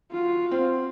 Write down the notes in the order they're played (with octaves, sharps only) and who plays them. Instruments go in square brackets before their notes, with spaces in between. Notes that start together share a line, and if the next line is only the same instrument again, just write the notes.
[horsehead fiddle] F4 F#4
[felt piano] C4